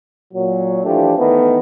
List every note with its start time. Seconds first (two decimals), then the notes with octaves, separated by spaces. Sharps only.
0.34 A#2 F#3
0.84 E3 F3 A3 D4 G4
1.18 D#3 E3 A3 B3